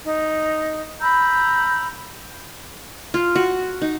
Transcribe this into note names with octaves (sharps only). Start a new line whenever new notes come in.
D#4
A#5 B5 E6 G6
F4
F#4
D#4